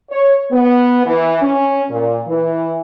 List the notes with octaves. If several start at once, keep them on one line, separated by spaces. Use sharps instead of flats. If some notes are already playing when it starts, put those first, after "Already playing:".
C#5
B3
E3
C#4
A#2
E3